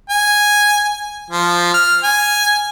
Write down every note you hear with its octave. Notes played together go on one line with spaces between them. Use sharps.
G#5
F3
F6
G#5